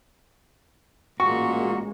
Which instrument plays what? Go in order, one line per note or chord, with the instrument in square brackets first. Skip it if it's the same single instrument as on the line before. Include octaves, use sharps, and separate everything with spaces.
[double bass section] A1 G#3 A#3 [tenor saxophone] A#2 [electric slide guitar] F#4 [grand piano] C#6